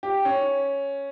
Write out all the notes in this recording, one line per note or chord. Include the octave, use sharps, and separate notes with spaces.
G4
C#4